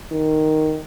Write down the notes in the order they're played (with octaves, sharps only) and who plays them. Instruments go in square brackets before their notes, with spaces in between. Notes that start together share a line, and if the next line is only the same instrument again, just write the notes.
[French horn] D#3